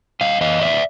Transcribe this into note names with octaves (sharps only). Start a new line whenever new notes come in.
G3 D#5 F5
E3 D#5 F5
A2 D5 E5